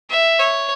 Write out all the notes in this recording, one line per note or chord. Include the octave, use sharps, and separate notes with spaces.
E5
C#5